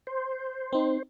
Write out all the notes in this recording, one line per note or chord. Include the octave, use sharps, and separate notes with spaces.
C5
C4 D#4